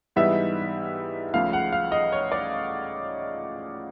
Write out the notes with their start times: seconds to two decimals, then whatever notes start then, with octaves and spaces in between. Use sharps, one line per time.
0.16 G#2 E3 G3 B3 D#4 E5
1.33 C#2 C#3 F3 A3 F5
1.53 F#5
1.72 F5
1.92 D#5
2.12 C#5
2.32 D5